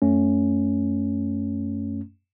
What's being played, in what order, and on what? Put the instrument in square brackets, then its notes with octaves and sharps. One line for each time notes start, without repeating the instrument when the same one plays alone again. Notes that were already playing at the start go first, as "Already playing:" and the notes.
[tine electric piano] F#2 A3 C#4